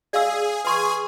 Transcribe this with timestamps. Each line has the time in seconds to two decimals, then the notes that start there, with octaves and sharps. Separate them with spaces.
0.13 G#4 D5 F5 E6
0.65 G#4 B4 G#5 C6 C#6